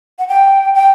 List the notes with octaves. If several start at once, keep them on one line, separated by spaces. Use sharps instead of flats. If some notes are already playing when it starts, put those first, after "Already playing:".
F#5
G5
G5